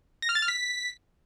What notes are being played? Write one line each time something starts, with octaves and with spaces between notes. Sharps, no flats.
A#6
F6
A6
F6
B6